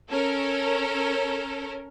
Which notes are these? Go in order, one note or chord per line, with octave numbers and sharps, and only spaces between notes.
C#4 A4 A#4